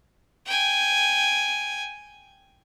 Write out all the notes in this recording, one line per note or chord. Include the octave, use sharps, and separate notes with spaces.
G5 G#5